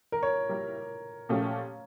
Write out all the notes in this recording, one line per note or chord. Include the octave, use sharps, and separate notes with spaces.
A#4
C#5
G3 A#3 E4 A#4
A#2 F3 A3 C#4 G4